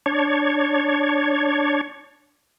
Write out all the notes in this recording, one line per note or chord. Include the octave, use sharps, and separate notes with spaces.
D4 C#5